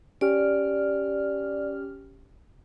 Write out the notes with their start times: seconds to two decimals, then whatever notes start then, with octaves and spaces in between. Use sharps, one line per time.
0.21 C#4 G4 D5 F6